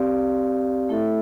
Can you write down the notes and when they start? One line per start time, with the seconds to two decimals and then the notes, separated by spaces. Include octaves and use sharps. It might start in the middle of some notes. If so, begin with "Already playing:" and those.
Already playing: C4 G4 D5 F5
0.89 A3 E4 A4 E5